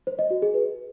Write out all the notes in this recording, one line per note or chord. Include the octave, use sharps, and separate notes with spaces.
C5
D#5
F#4
G#4
B4